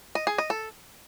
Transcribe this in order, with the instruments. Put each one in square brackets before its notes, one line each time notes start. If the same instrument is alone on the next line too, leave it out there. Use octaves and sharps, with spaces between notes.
[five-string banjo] D#5
G#4
D#5
A4